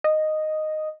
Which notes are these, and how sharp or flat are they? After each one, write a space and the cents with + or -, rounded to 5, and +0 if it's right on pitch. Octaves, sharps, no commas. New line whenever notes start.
D#5 -5